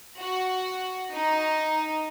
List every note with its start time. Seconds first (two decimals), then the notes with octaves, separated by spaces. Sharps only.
0.20 F#4
1.13 D#4